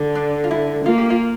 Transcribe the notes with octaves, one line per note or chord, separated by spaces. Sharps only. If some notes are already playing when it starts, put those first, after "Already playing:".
Already playing: D3
D4
F4
E4
A#3 F4
G4
F4